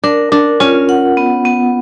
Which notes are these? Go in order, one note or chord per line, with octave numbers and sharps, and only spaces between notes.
D4 A#4
D4 A#4
C#4 F4
F#5
B3
B3